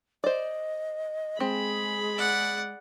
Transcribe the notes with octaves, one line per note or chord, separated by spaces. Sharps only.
C5 D5 D#5
G#3 C4 G#4 B5
D5 F#5